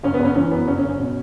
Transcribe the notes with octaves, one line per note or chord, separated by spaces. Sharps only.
F#1 C#4
B3
F#1
C#4
E3 C#4
F#2 B3
F#1 C#4
C#4
F#1
C#4
B2